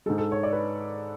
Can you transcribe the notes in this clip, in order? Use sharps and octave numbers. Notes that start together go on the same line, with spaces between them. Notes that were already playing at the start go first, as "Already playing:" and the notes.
G#2 G#3 A4
A4
C#5
D5
B4